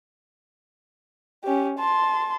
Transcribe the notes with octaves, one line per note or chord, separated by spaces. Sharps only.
C#4 G4
A5 C6